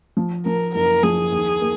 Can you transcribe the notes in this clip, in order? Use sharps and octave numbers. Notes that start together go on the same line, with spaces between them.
F3
F3 A#4
F#1 A#4
F3 G#4
D#2
A#3